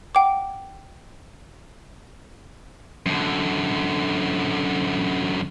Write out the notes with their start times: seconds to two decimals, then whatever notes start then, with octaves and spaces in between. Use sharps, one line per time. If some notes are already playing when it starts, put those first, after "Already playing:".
0.15 F#5 G5 D6
3.06 F#2 D3